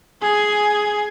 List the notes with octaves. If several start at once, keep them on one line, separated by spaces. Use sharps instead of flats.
G#4 G#5